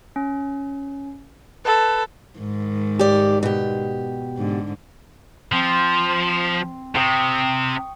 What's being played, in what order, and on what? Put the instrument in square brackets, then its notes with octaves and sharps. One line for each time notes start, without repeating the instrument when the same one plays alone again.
[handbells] C#4
[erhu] A4 [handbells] B4 A5 B5
[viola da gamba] G#2 D#3 G#3
[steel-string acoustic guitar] G4 D5
B2 G4
[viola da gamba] G#2 D3
[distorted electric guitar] F3 [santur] C4
[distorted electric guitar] C3 [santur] G5 C#6 D#6